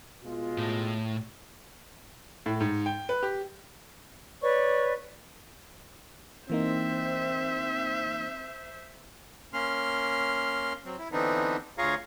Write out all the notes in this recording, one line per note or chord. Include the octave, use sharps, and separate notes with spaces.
B2 G#3 F4
A2
A2
G#2
G5
B4
G4
B4 C#5 D5 C#6
E3 A#3 C4 D#4 C5 E5
A#3 C#4 C6 F6
F#3 C4
E4
D3 E3 B3 C4 D4 D#4
D2 F4 G#4 C#5 F5 A#5